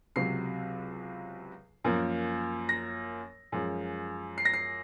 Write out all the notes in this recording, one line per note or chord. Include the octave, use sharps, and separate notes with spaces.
C#2 C3 F#3 C7
F#2 F3 A#3
A#6
F#2 F3 G#3
C7
A#6
C7